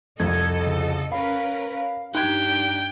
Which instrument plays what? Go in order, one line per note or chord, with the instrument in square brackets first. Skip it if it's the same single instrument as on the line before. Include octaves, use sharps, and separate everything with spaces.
[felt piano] C2 F2 [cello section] A4 D#5 [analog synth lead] G#6
[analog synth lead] C#3
[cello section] C#4 A#4 B4 [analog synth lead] F5 [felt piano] B5
[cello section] G2 D4 G4 [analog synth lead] D#4 [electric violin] G5 [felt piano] F#6 G#6